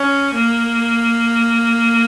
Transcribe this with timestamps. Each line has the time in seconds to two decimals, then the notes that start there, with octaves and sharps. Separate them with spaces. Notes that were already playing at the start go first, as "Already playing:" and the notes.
Already playing: C#4
0.35 A#3